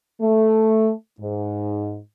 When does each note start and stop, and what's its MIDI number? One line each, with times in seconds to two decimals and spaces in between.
0.22 0.92 57
1.20 1.98 44